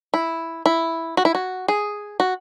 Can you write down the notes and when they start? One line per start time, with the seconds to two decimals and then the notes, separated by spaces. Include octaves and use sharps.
0.14 E4
0.66 E4
1.17 F#4
1.25 E4
1.35 F#4
1.68 G#4
2.20 F#4